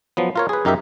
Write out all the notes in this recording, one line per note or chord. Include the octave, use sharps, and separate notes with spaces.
F3 F#3 B3
F4 A#4 C#5
G#4 B4
F#2 D#4 G4 A#4 E5